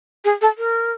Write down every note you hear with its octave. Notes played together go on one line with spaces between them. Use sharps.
G#4
A4
A#4